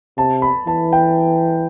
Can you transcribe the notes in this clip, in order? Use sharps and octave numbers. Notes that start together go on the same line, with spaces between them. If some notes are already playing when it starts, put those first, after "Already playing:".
C3 A5
B5
E3 A5
G5